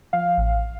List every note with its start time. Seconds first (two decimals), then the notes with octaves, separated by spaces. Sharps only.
0.13 F3 F5
0.37 A1